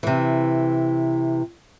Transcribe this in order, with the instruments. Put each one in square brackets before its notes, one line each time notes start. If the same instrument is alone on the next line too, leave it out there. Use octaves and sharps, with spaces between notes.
[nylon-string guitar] C3 E3